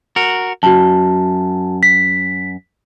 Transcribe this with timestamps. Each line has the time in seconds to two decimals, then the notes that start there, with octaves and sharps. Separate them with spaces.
0.16 F#4 A#4
0.63 F#2 F#4 A5
1.83 B6